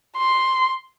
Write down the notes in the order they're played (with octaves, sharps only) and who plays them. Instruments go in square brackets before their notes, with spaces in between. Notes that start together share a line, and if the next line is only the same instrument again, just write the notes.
[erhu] C6